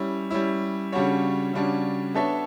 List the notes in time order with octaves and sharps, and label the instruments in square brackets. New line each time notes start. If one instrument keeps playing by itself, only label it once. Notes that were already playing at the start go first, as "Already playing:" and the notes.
Already playing: [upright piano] G3 C#4 E4
G3 C#4 E4
C#3 G3 D4 F#4 C#5
C#3 G3 D4 F#4 C#5
B3 D4 A4 C#5 E5